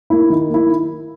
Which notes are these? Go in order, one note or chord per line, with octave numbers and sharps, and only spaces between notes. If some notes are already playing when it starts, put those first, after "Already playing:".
A#3 E4
D#3
A#3 E4